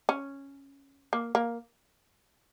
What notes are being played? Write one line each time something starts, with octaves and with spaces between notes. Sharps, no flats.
C#4
A#3
A#3